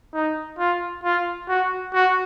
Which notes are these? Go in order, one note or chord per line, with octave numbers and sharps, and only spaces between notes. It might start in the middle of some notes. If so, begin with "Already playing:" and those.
D#4
F4
F4
F#4
F#4